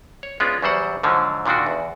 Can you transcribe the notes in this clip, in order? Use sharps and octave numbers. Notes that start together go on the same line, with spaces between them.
C#5
G#3 B3 C#4 D4 F4
E2 F#3 G3 C5 F#5
G#2 D3 F3 F#3
A#2 D3 D#3 D4 F#4
E2